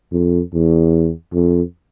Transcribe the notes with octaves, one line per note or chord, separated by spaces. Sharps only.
F2
E2
F2